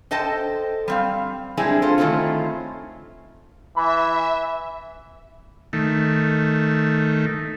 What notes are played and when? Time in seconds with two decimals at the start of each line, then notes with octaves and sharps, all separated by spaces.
0.11 A4 C5 D#5 G5 A5
0.88 G3 C4 F5
1.57 G3 G#3 C4 D4 E4 G#4
1.82 F4 A4 C5
1.98 D#3 A3 C4 C#4 E4 F4
3.76 E3 E5 B5
5.73 D#3 A3